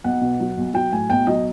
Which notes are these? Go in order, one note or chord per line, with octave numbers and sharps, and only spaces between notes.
B1 F#5
B2
F#3
B1
F#3 G5
A2 G#5
B1 G5
F#3 D#5